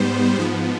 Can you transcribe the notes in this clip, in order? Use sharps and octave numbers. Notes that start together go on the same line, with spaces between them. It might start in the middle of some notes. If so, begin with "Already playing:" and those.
Already playing: G#2 G3 B3 C5
G#2 F3 B3